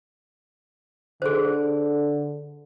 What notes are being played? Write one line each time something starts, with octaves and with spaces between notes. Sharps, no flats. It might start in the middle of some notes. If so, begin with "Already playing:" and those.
D3 G#4 C5